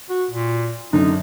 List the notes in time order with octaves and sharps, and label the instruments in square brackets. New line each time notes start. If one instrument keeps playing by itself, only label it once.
[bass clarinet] F#4
A#2
[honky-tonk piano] F#2 D3 D#3 [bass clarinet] D#4